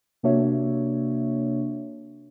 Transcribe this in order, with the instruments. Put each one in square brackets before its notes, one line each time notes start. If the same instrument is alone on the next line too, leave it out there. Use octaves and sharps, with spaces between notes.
[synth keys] C3 A#3 D4 F#4 C#5 E5